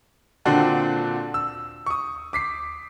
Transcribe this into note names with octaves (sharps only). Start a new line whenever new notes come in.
A#2 D3 C4 D4 F#4 A4
E6
C#6 D#6
D6 B6 C7